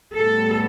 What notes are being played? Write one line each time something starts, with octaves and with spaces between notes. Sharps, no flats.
A2 G3 B3 A4